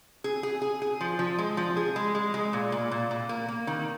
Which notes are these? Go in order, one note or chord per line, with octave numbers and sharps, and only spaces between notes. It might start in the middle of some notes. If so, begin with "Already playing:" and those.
G#4
G#4
G#4
G#4
F3
F3
G#3
F3
G#4
G#3
G#3
G#3
A#2
A#2
A#2
A#2
A#3
A#3
D#3